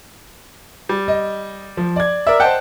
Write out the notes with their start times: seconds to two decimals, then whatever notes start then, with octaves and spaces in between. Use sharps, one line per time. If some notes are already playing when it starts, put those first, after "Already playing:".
0.89 G3
1.08 D#5
1.77 F3
1.96 D5 G#6
2.27 A#4 D5 E5
2.40 C5 D#5 F#5 G5 A5